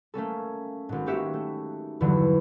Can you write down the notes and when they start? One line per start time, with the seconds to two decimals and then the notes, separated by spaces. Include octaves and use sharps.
0.14 A3 A#3 C#4 A4
0.89 G#1 G#2
1.06 A#3 D#4 F#4 G4 C#5 E5
1.34 A3
2.01 E2 G2 D3 E3 F#3